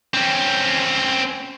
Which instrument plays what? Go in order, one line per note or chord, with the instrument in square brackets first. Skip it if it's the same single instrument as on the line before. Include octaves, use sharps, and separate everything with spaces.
[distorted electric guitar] C4 C#4